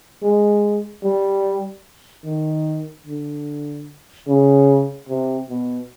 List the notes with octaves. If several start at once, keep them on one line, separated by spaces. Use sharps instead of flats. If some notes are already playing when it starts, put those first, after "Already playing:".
G#3
G3
D#3
D3
C#3
C3
B2